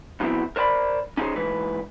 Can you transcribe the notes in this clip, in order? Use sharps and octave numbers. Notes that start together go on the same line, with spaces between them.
F2 E3 F#3 B3 C4 E4
A#4 C5 D5 A5 B5
C#4 D#4 E4 G#4 C5
G#2 E3 B4